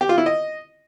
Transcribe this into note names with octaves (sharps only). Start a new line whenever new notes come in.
G4
F4
E4
D#5